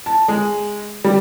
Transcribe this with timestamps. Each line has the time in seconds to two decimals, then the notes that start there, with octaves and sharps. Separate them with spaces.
0.06 A5
0.28 G#3
1.05 G3